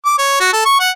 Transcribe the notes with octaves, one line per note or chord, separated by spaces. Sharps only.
D6
C#5
F#4
A4
C#6
F#5